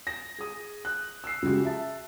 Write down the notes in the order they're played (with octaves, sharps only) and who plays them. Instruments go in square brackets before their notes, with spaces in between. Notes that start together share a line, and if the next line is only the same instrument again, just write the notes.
[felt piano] A#6
G#4 D#6
F#6
E6 C7
C#3 F3 G#3 F#4 G4
E5 A5